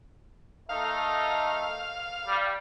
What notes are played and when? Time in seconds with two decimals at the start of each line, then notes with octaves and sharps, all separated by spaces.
0.69 A3 D#4 F5
2.27 G3